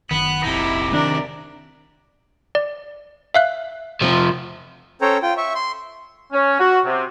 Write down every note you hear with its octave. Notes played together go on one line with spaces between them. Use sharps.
F#1 D#3 B3 F#6
F1 A#1 C3 D#4 E4
D#3 D4 A#4 D5
D5
E5 F5 F#6
C3 F3
C#4 A4 C5 C#5 G5 A#5
F4 G5
E5 C#6
C6
C#4
F#4
C3